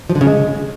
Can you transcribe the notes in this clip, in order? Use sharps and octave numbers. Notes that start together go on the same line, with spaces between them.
F3
D3
C#3
G#3